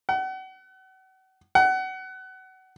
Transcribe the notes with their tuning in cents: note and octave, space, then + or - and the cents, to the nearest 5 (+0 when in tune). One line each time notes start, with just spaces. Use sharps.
F#5 +35
F#5 +25